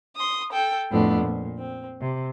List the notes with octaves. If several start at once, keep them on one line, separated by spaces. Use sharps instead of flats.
C6 D#6
A4 G5
F2 A2 F3 A3 B3 D4
A#2
C4
C3